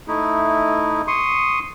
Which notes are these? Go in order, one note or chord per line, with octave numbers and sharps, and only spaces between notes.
A3 D#4 E4
C6 C#6 D#6